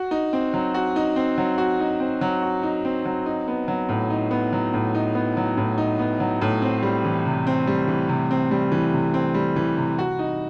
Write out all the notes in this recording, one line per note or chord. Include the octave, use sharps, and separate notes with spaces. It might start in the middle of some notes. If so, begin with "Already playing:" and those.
Already playing: F#4
D#4
C4
F#3
F#4
D#4
C4
F#3
F#4
D#4
C4
F#3
F#4
D#4
C4
F#3
D#4
B3
F#3
A2
D#4
B3
F#3
A2
D#4
B3
F#3
A2
D#4
B3
F#3
A2
C4
G3
E3
C3
C4
G3
E3
C3
C4
G3
E3
C3
C4
G3
E3
C3
F#4
D#4